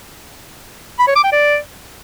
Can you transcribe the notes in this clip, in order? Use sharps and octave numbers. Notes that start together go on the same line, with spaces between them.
B5
C#5
D6
G5
D5